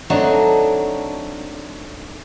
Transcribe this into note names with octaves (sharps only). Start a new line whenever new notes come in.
F#3 A3 C4 D4 D#4 F#4